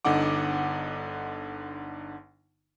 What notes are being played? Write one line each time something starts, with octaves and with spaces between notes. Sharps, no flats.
G1 D3 D#4 F#5 D6